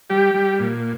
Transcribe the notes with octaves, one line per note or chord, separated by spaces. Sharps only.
G3 G4
G3
A#2